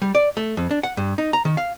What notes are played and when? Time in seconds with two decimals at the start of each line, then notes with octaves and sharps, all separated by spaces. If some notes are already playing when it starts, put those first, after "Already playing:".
0.02 G3
0.15 D5
0.37 A3
0.57 F2
0.71 D4
0.83 F#5
0.97 G2
1.18 D#4
1.33 A#5
1.45 D#3
1.57 F5